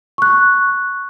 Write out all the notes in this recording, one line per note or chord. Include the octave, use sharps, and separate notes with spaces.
C#6 F#6